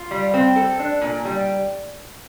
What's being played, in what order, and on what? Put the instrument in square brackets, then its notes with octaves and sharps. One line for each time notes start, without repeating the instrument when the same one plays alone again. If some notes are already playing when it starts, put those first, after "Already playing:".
Already playing: [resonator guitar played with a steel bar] F4
G3
C4
A4
D4
A#2
G3